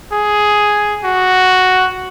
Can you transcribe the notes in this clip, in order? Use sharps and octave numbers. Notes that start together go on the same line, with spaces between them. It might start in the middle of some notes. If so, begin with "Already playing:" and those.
G#4
F#4